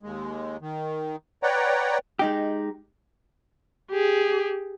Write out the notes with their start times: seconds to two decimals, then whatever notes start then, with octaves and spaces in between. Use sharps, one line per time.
0.03 D#2 G#3
0.61 D#3
1.43 B4 C#5 D5 F#5 G5 A#5
2.19 G#3 D#4 G4
3.91 G4 G#4